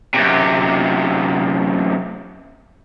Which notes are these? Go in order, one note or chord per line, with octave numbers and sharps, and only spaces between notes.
F#2 C3